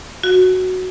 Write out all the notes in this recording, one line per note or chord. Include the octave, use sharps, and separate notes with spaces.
F#4